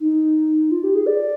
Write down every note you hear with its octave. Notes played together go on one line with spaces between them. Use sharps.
D#4
F4
G4
G#4
D5